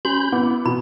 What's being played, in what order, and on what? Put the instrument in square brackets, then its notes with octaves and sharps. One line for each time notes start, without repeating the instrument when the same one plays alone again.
[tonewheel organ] C#4 B5 G6 [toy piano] F#4
[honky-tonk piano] B3 D6 [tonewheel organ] E4
[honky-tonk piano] B2 [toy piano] B5